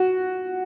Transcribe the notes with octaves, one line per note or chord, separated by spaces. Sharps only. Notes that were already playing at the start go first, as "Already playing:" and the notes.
Already playing: F#4